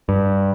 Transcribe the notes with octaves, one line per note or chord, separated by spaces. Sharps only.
G2